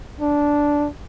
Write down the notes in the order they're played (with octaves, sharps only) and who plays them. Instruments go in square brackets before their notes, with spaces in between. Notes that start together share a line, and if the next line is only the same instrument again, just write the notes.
[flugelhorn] D4